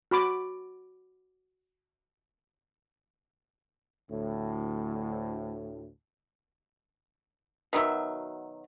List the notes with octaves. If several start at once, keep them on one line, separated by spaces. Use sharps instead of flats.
F#4 B5 D6
D2 A2
B2 D#3 F#3 E5